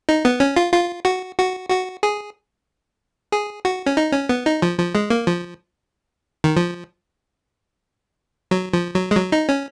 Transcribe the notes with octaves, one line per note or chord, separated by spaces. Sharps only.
D#4
B3
C#4
F4
F4
F#4
F#4
F#4
G#4
G#4
F#4
C#4
D#4
C#4
B3
D#4
F3
F3
G#3
A#3
F3
D#3
F3
F#3
F3
F#3
G#3
F#3
D#4
C#4